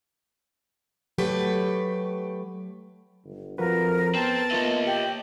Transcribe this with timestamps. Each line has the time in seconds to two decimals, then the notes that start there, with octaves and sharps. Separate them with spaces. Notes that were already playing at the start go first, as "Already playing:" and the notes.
1.18 F#3 A3 G4 B4
3.24 G1
3.58 F2 F3 F#4 A#4 B4
4.15 B3 C4 A5
4.51 A#3 F4 C#5 D#5 E5
4.86 G4